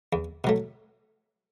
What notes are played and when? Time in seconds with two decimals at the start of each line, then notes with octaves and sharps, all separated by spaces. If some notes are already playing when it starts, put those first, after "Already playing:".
0.13 E2
0.44 B2 F#3 A3